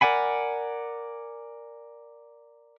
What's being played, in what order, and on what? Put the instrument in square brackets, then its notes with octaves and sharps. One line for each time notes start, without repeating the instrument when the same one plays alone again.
[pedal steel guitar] A#4 D5 F#5 G#5 B5